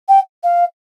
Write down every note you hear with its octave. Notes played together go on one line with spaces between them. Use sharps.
G5
F5